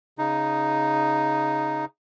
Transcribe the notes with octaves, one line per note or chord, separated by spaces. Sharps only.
C#3 D#4